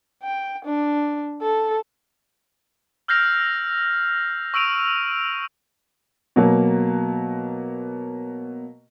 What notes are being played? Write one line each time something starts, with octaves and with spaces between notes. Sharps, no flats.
G5
D4
A4
E6 F6 G6 A#6 C7 F7
C#6 E6 D7 D#7 F7
B2 F#3 A#3